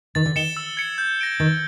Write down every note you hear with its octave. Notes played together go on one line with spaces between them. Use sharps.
D#3 A6
D3
D#3 C#7 E7 G7
E6
G#6 C#7
G6
A#6 D7 G7
D#3 A6